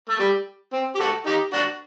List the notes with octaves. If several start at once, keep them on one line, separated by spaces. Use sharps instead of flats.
A3
G3
C4
G4
F#4 A4
D#4 G4
D4 F#4